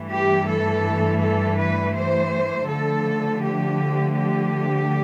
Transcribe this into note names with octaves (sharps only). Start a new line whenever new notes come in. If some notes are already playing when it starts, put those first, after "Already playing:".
Already playing: G2 E3 A3
G4
A4
A4
B4
C5
D3 F3 A3 A4
G4
G4